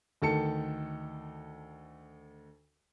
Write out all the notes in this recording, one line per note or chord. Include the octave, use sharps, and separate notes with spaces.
D2 D#3 A4 A5 C#7